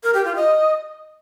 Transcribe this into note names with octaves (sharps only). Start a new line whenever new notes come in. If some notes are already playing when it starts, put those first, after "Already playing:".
A#4
G4
F4
D#5